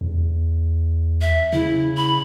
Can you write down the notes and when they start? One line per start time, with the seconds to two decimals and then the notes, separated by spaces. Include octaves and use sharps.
0.01 E2
1.21 E5
1.53 C#3 E4
1.97 B5